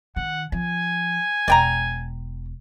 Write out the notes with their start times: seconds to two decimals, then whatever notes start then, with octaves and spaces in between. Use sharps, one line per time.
0.16 D#3 F#5
0.52 F3 G#5
1.48 E1 D5 G5 A#5